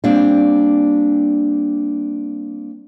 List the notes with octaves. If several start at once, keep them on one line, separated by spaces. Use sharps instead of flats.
G3 A#3 C4 D4